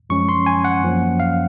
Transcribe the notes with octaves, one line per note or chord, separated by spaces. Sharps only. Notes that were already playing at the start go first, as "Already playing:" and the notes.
F#2 F3 G#3 C#4 C#6
C6
G#5
F#5
F#2 F3 A#3 C#4
F5